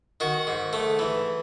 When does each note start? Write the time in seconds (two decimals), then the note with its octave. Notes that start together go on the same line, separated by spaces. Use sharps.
0.20 D#3 F#4
0.47 G#2
0.73 A3
0.99 E3